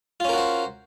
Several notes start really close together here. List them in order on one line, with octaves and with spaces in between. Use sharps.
F4 C#4 A#4 F#4 C5